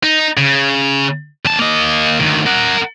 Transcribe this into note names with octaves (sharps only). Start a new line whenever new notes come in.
D#4
C#3
E2 A5
A#3 D#5
D2 D#3
A#4 F#5